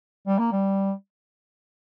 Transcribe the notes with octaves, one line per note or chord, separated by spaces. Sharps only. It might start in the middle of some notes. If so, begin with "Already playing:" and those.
G3
A#3
G3